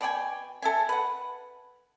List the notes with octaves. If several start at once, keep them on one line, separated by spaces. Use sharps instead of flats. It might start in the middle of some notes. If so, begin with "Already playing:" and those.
B2 D5 G5 G#5
A4 E5 G#5
B4 F#5